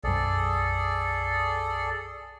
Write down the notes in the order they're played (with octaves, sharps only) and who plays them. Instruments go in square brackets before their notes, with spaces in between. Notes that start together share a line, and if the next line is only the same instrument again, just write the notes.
[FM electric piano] B1 F#2 [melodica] G#4 A4 D5